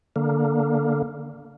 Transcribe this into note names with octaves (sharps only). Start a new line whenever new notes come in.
D3 A#3